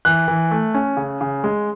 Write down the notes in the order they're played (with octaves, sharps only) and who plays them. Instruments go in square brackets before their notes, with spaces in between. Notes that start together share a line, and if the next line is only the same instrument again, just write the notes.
[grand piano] E3 F#6
E3
A3
C#4
C#3
C#3
G#3